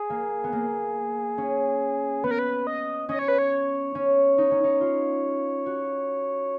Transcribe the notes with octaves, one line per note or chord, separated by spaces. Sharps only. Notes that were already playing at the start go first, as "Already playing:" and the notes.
Already playing: G#4
A#3
B3
A#3
C#4
B3 B4
A#4
B4
D#5
C#4 D#5
C#5
B4
C#5
C#4
D#4
C#4
D#4
F4
F#4